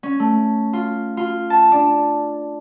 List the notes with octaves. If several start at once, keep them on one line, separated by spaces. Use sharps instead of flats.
C#4
A3
F4
F4
A5
D4